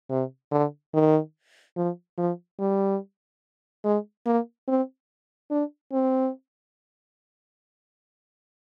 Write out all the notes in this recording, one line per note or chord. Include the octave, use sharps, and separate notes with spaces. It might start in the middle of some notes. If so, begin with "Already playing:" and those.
C3
D3
D#3
F3
F3
G3
G#3
A#3
C4
D4
C4